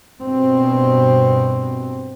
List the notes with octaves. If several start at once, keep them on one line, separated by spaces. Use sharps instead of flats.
G2 B2 C4